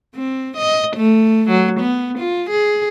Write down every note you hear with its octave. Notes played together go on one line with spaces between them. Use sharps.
C4
D#5
A3
F#3
B3
F4
G#4